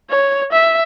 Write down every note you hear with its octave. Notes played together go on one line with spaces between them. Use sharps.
C#5
E5